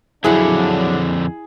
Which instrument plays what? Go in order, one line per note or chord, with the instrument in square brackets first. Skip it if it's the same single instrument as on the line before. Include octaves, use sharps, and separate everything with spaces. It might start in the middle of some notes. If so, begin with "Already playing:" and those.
[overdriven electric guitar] F2 D3 [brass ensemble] F#3 D4 [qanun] E4 F#5 [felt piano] G#4